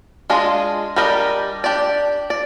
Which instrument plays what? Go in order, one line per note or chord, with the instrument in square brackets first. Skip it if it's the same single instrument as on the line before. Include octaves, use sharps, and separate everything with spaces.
[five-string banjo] G#3 D4 F4 G#4 D#5
G3 D4 G4 A#4 D#5
D4 G4 D5
D5